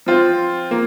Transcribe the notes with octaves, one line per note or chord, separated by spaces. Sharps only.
F3 C4 F4 C5
F3 A#3